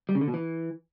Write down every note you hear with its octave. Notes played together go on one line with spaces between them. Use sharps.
G3
C#3
D3
B2
E3